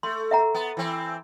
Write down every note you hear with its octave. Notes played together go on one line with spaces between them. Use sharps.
A3 C6
E5 F#5 A#5
B3
E3 C4